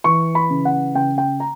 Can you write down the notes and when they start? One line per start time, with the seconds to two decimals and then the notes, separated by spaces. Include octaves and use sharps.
0.04 E3 C#6
0.35 B5
0.50 C#3
0.65 F#5
0.95 C#3 G5
1.18 G5
1.40 A#5